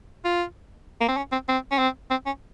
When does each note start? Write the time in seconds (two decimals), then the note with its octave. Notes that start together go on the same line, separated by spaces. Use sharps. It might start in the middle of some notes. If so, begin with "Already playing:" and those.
0.25 F4
1.00 A#3
1.08 C4
1.17 C#4
1.32 C4
1.48 C4
1.71 C#4
1.79 C4
2.10 C4
2.26 C#4